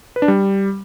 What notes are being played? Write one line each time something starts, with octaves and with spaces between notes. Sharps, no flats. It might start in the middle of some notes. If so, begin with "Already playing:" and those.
B4
D4
G3